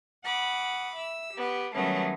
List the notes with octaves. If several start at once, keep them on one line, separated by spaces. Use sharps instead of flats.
F#5 B5 D6 D#6
E5 E6
B3 G4
D#3 F#3 G3 A3 B3 C#4